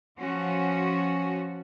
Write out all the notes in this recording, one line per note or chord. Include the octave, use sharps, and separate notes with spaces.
F3 C#4 F#4